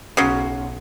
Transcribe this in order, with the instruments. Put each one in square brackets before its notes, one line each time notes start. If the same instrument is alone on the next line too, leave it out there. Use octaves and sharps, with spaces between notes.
[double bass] B1 [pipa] C#3 F#3